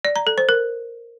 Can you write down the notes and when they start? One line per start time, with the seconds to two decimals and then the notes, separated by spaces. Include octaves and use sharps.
0.05 D5
0.16 A#5
0.27 A4
0.38 C5
0.49 A#4